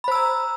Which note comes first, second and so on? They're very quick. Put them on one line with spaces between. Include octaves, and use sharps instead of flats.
B5 C5 E6 A#5